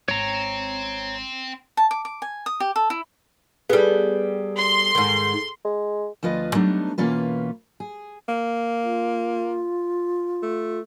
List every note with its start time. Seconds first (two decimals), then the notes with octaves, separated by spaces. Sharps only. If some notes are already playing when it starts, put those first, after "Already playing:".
0.08 G#1 C4 C#5 A#5
1.77 A5
1.91 D6
2.05 D6
2.22 G#5
2.46 D#6
2.60 G4
2.76 A4
2.90 E4
3.69 G3 B3 G#4 A4
4.58 C6
4.95 G#2 D#3
5.65 G#3
6.23 D2 F3 F4 B4 D#5
6.55 F#3 G3 A3 B3 D4 D#4
6.98 B2 E3 A#3 C#4 F4 B4
7.80 G#4
8.29 A#3
8.83 F4
10.43 A3